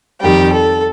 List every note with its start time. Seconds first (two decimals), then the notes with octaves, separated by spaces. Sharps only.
0.21 F2 D#3 G3 G4
0.51 A4